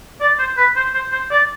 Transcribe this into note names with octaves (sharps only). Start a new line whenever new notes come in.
D5
C5
B4
C5
C5
C5
D5